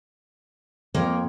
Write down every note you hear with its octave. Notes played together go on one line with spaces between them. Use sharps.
F2 A#3